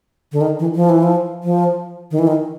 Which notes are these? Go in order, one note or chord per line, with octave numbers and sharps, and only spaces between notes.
D3
D#3
E3
F3
E3
F3
F3
D#3
E3
D#3